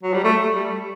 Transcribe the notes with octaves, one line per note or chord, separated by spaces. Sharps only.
F#3
G3
A3
G3